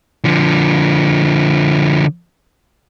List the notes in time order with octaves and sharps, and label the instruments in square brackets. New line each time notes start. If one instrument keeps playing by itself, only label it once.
[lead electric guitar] D3 F3